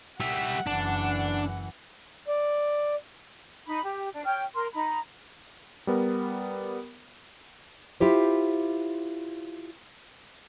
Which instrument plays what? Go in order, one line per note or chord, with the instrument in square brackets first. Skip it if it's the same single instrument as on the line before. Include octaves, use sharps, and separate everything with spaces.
[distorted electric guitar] G3 E5 [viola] F#5
[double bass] F#1 E3 [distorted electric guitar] D4
[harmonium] D5
[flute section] D#4 B5
G4
D4
C#5 G5 F6
A#4 C6
D#4 A#5 B5
[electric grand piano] G3 B3 A#4
[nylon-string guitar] E4 F4 G4 C5